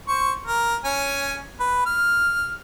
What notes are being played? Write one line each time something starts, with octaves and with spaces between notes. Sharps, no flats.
C5 C#6
A#4
C#4 G#5
B4
F6